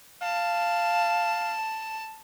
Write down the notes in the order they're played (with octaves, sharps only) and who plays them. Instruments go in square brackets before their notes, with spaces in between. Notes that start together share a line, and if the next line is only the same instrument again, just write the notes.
[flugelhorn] F5 [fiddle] A5